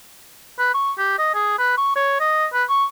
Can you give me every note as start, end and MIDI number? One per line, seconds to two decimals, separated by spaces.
0.59 0.74 71
0.74 0.92 85
0.98 1.16 67
1.19 1.34 75
1.34 1.56 68
1.58 1.74 71
1.77 1.94 85
1.96 2.18 73
2.20 2.46 75
2.53 2.64 71
2.69 2.85 85